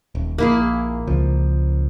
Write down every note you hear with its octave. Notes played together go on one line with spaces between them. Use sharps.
D#1
A#1 A#3 E4 G#4
C#2 F3